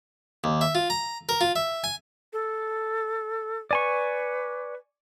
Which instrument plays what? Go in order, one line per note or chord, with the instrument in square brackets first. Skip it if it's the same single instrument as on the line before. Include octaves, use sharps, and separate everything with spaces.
[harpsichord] D#2
E5
F4
A#5
A#4
F4
E5
G#5
[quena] A4
[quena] B4 [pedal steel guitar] D5 G#5 C#6